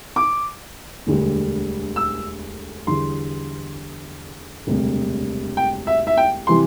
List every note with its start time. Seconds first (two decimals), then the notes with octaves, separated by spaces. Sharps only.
0.16 D6
1.07 E1 D2 D3 G3
1.96 E6
2.87 E2 D3 G3 C6
4.67 E1 D2 C3 G3
5.57 G5
5.87 E5
6.07 E5
6.17 G5
6.47 C3 E3 G3 C6